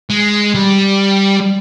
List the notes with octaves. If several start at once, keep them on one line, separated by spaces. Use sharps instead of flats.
G#3
G3